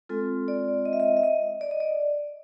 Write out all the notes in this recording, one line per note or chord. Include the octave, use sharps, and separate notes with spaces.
G#3 C4 F4 A4
D5
D#5
E5
D#5
E5
D#5
D5
D#5
D5